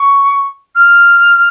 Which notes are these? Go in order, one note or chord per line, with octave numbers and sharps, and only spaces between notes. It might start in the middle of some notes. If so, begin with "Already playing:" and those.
Already playing: C#6
F6